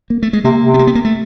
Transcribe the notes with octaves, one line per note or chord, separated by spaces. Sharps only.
A#3
A3
G#3
C3 A#3
C3
B3
A#3
B3
A#3
A3